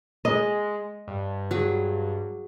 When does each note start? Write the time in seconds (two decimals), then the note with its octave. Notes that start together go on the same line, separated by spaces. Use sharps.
0.25 G#3 D#5
1.07 G2
1.51 F#3 G#4